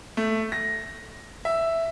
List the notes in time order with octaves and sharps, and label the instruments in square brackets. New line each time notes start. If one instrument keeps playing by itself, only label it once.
[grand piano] A3
A#6
E5